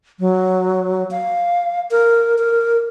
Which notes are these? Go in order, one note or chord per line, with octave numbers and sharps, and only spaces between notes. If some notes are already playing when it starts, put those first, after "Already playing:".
F#3
F5
A#4
A#4